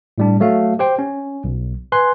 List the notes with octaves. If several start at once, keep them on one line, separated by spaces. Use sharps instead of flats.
A2 G3 D4
F#3 A3 F#4 F5
G4 C5 G5
C#4
B1
B4 G#5 C6 F#6